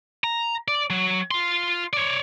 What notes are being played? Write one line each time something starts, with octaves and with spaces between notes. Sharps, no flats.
A#5
D5
F#3
F4 C6
C#5 D5